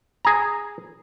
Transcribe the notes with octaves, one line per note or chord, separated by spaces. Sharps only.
G#4 A#5